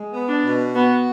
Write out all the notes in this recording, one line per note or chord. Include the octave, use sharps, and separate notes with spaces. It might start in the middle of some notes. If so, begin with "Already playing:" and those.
Already playing: G#3
B3
D4
B2
B3 F#4